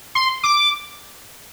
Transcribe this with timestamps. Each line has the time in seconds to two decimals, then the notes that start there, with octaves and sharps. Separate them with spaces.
0.15 C6
0.43 D6